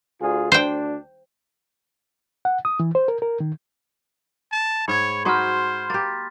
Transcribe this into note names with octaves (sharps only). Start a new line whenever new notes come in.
D2 F4 G#4
D2 D4 C5 G5
F#5
D#6
E3
C5
A#4
A#4
D#3
A5
G#2 C#5 B5 G#6
D#4 F#4 B4 C5 C6 F6
A#3 G4 A6